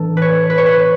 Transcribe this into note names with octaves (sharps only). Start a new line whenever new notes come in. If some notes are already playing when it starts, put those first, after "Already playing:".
Already playing: A2 E3 D4 A4
B4
C#5
B4
C#5
B4